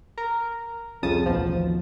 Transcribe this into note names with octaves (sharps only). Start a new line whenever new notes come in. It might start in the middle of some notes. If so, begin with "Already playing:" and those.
A#4
C2 F2 C#3 A5 D#6
A1 D#2 B2 F3